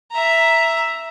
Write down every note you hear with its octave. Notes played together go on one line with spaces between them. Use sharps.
E5 A#5